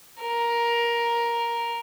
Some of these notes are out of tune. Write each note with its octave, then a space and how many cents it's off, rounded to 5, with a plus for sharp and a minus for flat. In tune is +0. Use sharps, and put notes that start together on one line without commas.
A#4 +10